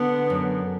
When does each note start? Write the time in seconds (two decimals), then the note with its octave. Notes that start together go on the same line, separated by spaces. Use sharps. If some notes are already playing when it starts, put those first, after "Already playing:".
Already playing: D3 B3
0.30 F#2